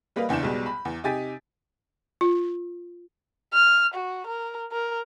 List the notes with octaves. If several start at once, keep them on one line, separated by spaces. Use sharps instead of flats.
G3 A#3 B4 D#5 F5
F#1 E2 D4 G6 E7
B1 B2 G3 G#3
B5
E2
C3 D#4 G4 G#5 A6 B6
F4
F6
F#4
A#4
A#4